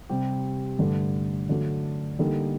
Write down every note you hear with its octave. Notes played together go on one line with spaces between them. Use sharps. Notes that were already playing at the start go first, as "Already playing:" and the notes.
C3 G3 C4 G4
G2 D3 A3
D3 F#3 A3 D4
D3 G3 A#3 D#4 A4